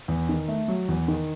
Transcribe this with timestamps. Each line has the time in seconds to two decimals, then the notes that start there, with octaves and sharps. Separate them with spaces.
0.08 E2
0.29 D#3
0.48 A3
0.68 F#3
0.88 E2
1.08 D#3